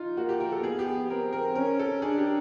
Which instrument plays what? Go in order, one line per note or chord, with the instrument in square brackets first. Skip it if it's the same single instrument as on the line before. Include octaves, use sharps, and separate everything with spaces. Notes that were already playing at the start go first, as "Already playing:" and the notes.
Already playing: [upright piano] D#4 F4
[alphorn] A#3 [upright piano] F#4
[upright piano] G4
A#4
A4
[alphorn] B3 [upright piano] G#4
[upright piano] G4
G#4
[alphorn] C4 [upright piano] A#4
[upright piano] A#4
[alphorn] C#4 [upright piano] A#4
[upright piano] A4
[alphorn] D4 [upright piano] G#4
[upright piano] G4